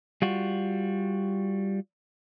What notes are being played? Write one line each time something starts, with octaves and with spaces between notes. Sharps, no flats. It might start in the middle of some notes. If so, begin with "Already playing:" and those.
G3 F4 F#4